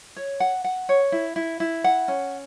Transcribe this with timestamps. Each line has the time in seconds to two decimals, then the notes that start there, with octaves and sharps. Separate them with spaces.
0.17 C#5
0.40 F#5
0.64 F#5
0.89 C#5
1.12 E4
1.36 E4
1.60 E4
1.84 F#5
2.08 C#4